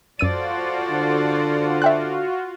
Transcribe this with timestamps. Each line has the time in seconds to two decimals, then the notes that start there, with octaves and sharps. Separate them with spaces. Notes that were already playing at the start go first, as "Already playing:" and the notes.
0.19 F#2 F4 F#4 A4 C5 D5 E6 D#7
0.90 D3
1.82 E5 G5 F#6